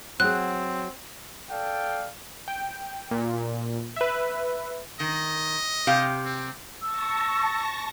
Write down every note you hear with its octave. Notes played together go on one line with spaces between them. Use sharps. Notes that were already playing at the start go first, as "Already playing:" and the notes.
F#3 C4 G#4 F#6
A4 D5 F5 G5
G5
A#2
B4 E5
D#3 D#5
C3 G4 F5
C4
A5 C#6 E6 A#6